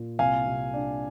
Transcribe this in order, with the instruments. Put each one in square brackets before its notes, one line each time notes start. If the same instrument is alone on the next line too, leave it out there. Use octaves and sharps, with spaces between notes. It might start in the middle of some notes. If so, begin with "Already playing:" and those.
Already playing: [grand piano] A#2
C2 F5 G#5
C3
D4